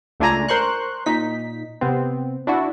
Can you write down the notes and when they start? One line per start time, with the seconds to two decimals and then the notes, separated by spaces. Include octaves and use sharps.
0.20 C#2 A3 D4 F4 G#5 A#5
0.48 A#4 C5 C6 C#6 F#6
1.06 A#2 D#4 B6
1.81 C3 B3 C4
2.47 D4 E4 F#4